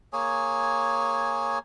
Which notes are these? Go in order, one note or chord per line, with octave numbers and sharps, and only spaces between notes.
A#3 G#4 C#5 G#5